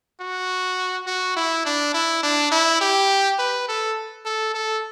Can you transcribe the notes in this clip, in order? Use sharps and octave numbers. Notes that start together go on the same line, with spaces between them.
F#4
F#4
E4
D4
E4
D4
E4
G4
B4
A4
A4
A4